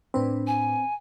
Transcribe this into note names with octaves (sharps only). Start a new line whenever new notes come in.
A2 C4 D4 B4
G#5